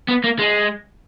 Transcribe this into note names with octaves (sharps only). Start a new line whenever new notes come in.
B3
A#3
G#3